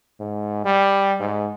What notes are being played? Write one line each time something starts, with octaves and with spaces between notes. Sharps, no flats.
G#2
G3
G#2